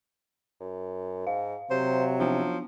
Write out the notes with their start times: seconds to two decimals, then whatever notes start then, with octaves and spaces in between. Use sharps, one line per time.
0.60 F#2
1.27 G#2 F5
1.71 C3 F#3 C5
2.20 F3 B3 D4